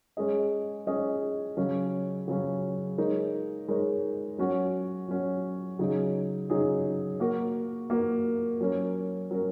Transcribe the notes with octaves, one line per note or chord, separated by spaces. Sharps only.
G#3 C#4 G#4 D#5
G#3 C#4 G#4 D#5
C#3 F#3 C#4
C#3 F#3 C#4
G#3 D#4 A#4 C#5
G#3 D#4 A#4 C#5
F#3 C#4 F#4
F#3 C#4 F#4
C#3 F#3 D#4 G#4
C#3 F#3 D#4 G#4
A#3 F#4 A#4
A#3 F#4 A#4
F#3 C#4 A#4
F#3 C#4 A#4